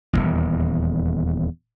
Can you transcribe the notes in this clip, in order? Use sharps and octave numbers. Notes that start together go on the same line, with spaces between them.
D#1 G#1 E2